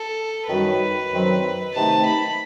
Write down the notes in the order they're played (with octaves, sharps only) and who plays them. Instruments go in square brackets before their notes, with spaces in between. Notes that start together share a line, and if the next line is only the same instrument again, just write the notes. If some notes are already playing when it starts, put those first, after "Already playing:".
Already playing: [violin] A4
[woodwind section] F#2 D#3 G3 D#4 F#4 [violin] B4
[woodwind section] F#2 D#3 F#3 C4
[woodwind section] C3 D#3 A3 D#4 [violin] A5
[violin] B5